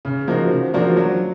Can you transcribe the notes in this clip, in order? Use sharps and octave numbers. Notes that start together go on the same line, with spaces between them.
C#3
F3 A#3 D#4 F#4
C#3
F3 A#3 D4 F#4
F#3